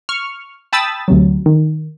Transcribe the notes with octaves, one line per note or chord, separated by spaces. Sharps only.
C#6 F6
G5 A5 B5 D#6 E6 A6
D2 C3 F#3
D#3